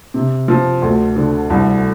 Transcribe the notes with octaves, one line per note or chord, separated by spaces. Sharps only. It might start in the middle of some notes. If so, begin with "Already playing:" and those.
C3
F3
D2
D3
C2